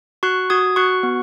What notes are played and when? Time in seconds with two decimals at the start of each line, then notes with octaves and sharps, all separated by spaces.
0.23 F#4 C#6 F#6
0.50 F#4 D#6 G#6
0.76 F#4 C#6 F#6
1.03 B3